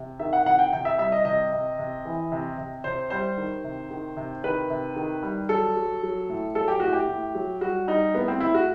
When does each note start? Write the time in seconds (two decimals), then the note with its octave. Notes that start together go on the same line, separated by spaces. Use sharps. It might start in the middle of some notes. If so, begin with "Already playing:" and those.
Already playing: C3
0.20 D#3 E5
0.33 F#5
0.45 C3 F#5
0.59 G5
0.72 C3 G5
0.85 E5
0.98 G3 E5
1.12 D#5
1.25 C3 D#5
1.52 C3
1.79 C3
2.05 E3
2.32 C3
2.58 C3
2.84 C3 C5
3.10 G3 C5
3.38 D#3
3.64 C3
3.91 D#3
4.17 C3
4.44 D#3 B4
4.70 C3
4.96 D#3
5.23 G3
5.49 F#3 A4
5.76 F#3
6.03 F#3
6.29 A2
6.55 F#3 A4
6.68 G4
6.80 A2 F#4
6.93 G4
7.08 A2
7.35 F#3
7.61 G3 F#4
7.88 G3 D#4
8.14 A2 B3
8.28 C4
8.40 A2 E4
8.54 F#4